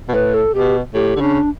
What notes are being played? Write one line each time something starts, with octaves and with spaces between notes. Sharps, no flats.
B2
A2 B4
A4
B2 G4
A2 G4
D3
C#3 D4